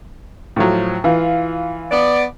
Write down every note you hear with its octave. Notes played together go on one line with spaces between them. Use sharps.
A2 F3 F#3
E3 F4
B3 D5